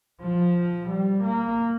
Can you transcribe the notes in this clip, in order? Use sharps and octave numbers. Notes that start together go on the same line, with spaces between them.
F3
G3
A#3